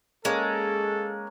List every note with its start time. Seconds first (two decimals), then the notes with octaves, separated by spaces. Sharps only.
0.25 G#3 A#3 C#4 A4